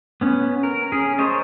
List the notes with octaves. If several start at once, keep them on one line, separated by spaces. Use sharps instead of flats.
B3 C#4
A#4
C#4 G#4
A#4 C5 C#5 D#5 A5